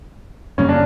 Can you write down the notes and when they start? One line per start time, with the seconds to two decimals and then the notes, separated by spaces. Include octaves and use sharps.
0.58 F#2 C#3 G3 A#3 C#4
0.69 D4